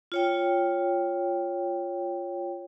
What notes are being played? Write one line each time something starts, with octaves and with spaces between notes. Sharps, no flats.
F4 C#5 G5